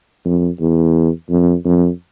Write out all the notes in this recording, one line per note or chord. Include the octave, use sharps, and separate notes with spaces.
F2
E2
F2
F2